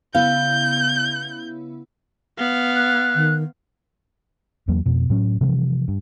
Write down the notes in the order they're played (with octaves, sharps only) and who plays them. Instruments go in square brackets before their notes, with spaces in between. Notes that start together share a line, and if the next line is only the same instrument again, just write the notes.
[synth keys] C#3 B3 E4 [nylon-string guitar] F5 [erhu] G6
[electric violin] B3 F5
[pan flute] F#6
[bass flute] D#3
[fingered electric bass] E2 F#3 A#3
F2 B2
A2 F#3 C#4
C3 E3 F3 G3
G2